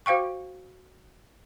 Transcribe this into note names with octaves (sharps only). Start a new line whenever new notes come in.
F#4 C5 F5 G5 C#6